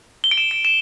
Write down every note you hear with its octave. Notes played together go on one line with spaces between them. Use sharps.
G7
D7
E7
D7
E7